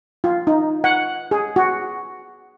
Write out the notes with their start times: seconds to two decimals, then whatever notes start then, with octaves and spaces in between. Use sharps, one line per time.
0.24 F4
0.47 D#4
0.84 F#5
1.31 G#4
1.56 F#4